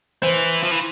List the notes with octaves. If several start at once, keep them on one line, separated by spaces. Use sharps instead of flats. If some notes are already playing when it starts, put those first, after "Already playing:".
E3 C5
F3
E3